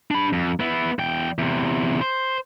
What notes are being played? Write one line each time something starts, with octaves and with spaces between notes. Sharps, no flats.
D4 B5
F2
B3 E4
E2 G5
E2 C3
C5